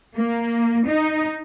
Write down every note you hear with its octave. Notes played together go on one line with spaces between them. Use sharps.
A#3
D#4